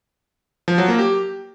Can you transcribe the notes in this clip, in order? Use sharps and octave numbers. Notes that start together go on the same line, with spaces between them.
F3
F#3
A#3
G4